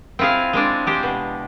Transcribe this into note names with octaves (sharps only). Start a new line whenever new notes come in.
C4 E4 F4 G#4 F5
G#3 C4 D4
G#3 G4 C5
B2